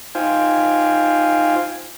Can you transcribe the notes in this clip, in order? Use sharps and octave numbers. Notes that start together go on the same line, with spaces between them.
D#4 F4 C5 F5 G5 G#5